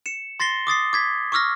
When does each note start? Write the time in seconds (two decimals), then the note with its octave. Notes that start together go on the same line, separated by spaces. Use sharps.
0.06 C#7 E7
0.40 C6 A6 A#6 C7 G7
0.67 D6 D#6 A6 C7
0.93 D6 G#6 B6
1.32 C#6 D6 E6 F6 A#6